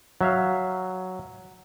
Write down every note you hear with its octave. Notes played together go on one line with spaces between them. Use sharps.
F#3 E5 F5